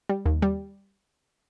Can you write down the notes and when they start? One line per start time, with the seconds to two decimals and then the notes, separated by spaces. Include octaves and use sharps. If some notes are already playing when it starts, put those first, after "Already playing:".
0.09 G3
0.26 D#2
0.42 G3